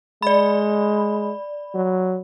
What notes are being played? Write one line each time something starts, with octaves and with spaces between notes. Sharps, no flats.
G#3 D5 B5
F#3